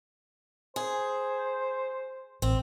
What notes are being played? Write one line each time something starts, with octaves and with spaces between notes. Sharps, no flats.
G#4 C5
A1 C4